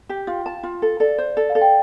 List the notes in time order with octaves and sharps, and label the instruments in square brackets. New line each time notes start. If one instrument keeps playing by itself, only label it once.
[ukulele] G4
[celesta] G5
[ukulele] F4 [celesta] F5
[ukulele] A5
F4
A4
[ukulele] A4 [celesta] D5
[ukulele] C5
[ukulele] A4 [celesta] D5
[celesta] F5
[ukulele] A4
[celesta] G5